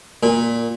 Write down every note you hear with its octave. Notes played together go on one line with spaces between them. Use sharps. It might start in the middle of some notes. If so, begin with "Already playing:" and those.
A#2